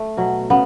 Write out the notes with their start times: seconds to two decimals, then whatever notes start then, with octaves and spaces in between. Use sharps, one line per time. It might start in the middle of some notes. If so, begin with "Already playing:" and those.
Already playing: A3
0.17 B2 F#3
0.50 C#3 B3